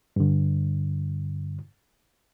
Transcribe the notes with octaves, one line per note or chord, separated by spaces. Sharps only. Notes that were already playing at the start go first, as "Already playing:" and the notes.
G2 D3